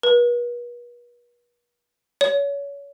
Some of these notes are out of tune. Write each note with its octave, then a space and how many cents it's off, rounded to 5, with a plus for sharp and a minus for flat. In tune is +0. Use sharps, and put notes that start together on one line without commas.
B4 -40
C#5 +30